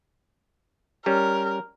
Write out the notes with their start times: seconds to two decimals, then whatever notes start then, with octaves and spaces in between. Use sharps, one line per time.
1.06 G3 C#4 A#4